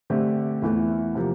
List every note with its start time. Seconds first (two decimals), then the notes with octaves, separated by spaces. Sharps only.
0.10 D3 A3 C4 G4
0.62 E2 E3 A3
1.15 C3 F3 A#3